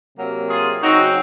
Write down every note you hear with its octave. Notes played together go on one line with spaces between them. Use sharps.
C3 F#3 A#3
F4 G#4
C#3 F#3 C4 D#4 F#4